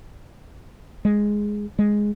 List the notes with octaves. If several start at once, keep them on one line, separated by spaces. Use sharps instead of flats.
G#3
G#3